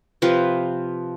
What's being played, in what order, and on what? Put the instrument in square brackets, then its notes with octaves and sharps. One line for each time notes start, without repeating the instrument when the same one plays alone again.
[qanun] C3 F3 B4